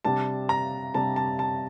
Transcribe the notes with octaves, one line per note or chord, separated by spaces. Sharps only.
C3 G3 D4 A5
A#5
C3 G3 D4 A5
A5
A5